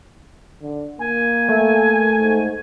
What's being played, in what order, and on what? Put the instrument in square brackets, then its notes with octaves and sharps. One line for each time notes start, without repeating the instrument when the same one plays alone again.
[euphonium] D3
[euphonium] A#3 [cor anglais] G#5
[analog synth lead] A3
[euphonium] G#2